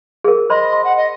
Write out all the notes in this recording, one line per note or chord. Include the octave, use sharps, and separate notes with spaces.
G#4 A#4
C5 D#5 B5 C6
C6
F#5
D#5